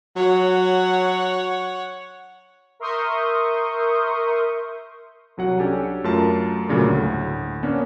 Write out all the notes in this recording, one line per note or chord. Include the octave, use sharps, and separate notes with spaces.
F#3 C#5 F#5
A#4 E5 C6 C#6 D#6 G6
C2 F#3 F#5
C#4 D4 G4 A4 G#5
F#2 A3 F4 A#4 A5
G2 A#2 C#3 F#3 A3
D2 A2
A#3 B3 C#4 D4